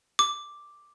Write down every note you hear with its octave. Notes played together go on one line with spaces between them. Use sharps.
D6